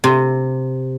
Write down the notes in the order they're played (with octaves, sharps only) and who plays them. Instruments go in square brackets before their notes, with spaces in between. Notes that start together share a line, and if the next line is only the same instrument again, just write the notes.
[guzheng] C3